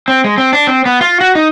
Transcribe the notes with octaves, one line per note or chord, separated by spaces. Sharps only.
C4
G#3
C4
D4
C4
B3
F4
F#4
D#4